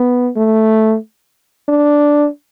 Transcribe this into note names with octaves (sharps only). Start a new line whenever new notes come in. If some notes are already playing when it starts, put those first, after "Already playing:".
Already playing: B3
A3
D4